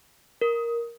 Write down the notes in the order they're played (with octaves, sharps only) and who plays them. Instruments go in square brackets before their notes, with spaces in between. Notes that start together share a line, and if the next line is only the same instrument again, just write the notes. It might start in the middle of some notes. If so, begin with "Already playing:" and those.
[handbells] A#4